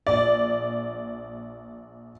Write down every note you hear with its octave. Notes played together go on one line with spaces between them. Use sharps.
A#1 D5